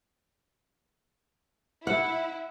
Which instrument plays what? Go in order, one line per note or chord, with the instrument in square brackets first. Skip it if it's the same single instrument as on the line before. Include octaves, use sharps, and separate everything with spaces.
[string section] E4 [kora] F#5